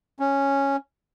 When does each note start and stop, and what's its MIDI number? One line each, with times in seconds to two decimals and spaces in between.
0.20 0.76 61